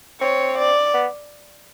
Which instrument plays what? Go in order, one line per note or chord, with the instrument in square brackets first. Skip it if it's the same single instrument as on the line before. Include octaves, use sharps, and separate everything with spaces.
[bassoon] C4 [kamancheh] C#5
[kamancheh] D5
[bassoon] B3